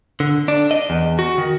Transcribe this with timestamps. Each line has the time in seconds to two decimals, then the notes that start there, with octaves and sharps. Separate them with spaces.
0.20 D3
0.48 D4
0.71 D#5
0.90 E2
1.19 F#4
1.38 D#3